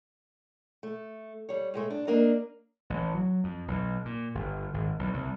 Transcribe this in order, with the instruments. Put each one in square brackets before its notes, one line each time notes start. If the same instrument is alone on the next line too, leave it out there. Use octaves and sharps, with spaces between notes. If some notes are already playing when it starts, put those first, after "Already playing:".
[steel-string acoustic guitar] A3
G3 C#5
A2 G#3 A3
D4
A#3 D4 A#4 D#5
[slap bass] A1
F#3
F2
B1
A#2
G1
G#1
B1
C2